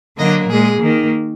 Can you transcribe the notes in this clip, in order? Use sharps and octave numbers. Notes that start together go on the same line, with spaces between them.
D3 F#3 A#3 D#5
A#2 G#3 G#4
D#3 A#3